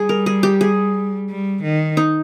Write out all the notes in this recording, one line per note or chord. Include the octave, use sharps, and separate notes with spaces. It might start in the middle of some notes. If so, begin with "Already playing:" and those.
Already playing: G3 G#4
A#4
G#4
G4
G#4
G3
D#3
D#4